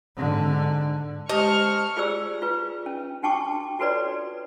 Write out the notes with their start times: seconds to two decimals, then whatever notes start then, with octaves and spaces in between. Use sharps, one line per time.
0.17 G#2 D3
1.29 G#3 G4 C5 D#5 A5 C#6 F6
1.97 F4 G4 G#4 C5 D5 E6
2.42 F4 B4
2.86 C#4
3.23 D4 F#4 G5 A5 C#6 D6
3.79 F4 F#4 A4 B4 C#5 D5